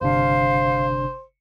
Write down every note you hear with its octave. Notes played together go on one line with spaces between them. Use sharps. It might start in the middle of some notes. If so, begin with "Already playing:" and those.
G1 C3 D4 C5 F5